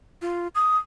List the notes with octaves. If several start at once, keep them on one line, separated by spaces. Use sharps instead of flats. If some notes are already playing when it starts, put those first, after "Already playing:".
F4
D#6